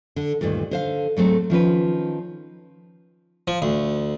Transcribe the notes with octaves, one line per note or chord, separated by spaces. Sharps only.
D3
D2 G2 A#2 D#3
D3 C5 F5
G#2 F#3 A3 C4
D#3 F3 C#4 B4
F3
D2